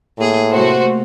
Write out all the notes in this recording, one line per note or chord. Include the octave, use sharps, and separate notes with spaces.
A2 A#3 G#4
C3 A3 A#3 F#4 C5